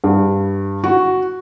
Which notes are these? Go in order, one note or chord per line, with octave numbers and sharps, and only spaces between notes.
G2
F#4